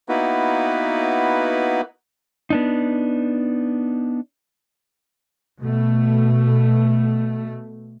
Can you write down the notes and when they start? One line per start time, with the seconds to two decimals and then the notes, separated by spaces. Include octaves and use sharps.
0.09 A#3 B3 D#4 E4 F#4 B4
2.50 B3 D4 D#4
5.59 B2 A3